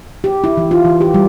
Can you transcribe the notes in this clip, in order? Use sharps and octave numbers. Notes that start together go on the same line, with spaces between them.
G4
E4
E3
F4
E3
G4
G3